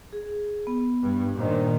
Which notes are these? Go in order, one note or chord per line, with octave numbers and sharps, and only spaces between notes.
G#4
B3
G2
A#2 D#3 D4 C5